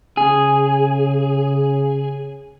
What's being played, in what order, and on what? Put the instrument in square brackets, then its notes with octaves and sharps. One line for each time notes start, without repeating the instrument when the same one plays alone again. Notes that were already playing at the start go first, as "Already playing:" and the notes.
[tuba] C#3 [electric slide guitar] G#4